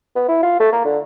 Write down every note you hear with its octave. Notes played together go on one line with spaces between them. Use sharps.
B3
E4
F4
A3
A#3
D3